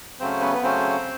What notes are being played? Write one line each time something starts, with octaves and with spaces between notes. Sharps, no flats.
C#3 F#3 A3 C4 C#4 C5
B3 B4
B4
C#3 F#3 A3 C4 C#4 C5